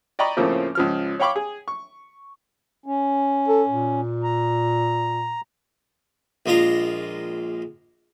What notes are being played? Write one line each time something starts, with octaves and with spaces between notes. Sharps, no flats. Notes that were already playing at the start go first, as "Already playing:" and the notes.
D5 D#5 G5 A#5 B5 C#6
A2 C#3 F3 A3 A#3 C4
C#2 F3 F6
C#5 F5 G5 B5 C#6 D6
G#4
C#6
C#4
A4
A#2
A#5
A#1 G#3 F4 A#5